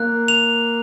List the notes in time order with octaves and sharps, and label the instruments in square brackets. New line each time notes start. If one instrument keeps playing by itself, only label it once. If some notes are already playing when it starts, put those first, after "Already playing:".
Already playing: [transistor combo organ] A#3 [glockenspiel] F#6
[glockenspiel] F7